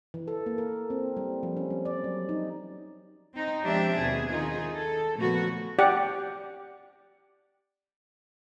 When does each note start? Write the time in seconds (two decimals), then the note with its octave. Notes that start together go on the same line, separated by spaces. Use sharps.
0.14 E3
0.28 A4
0.46 A#3
0.58 A#4
0.90 C4
1.17 G3
1.43 F3
1.57 C#4
1.70 G3
1.85 D5
2.04 F#3
2.29 D#4
3.34 C4 D#4
3.63 F3 G#3 C4 D4 G4 E5
3.98 D#2 B2 G#4
4.29 D#3 D#4 F4 G#4
4.74 A4
5.17 A#2 C#3 F3 A3 B3 F#4
5.79 G4 D5 F#5